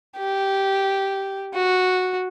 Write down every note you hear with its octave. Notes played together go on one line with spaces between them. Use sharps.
G4
F#4